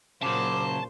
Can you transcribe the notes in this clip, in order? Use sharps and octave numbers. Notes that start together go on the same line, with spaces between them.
A#2 C#3 F#3 C5 A5 D6